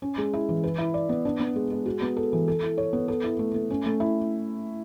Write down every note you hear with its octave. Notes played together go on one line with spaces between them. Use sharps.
C#4
G#3
E4
E3
B4
E4
D5
B3
D4
B3
G#3
G#3
F#4
B3
A4
E3
A4
E4
C#5
B3
A4
E4
A3
A3
C#4
A3
E4